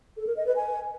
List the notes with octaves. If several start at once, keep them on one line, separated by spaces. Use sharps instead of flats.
A4
A#4
D#5
B4
G#5